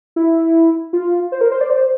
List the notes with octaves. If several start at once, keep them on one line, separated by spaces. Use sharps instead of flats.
E4
F4
C5
A#4
C5
D5
C5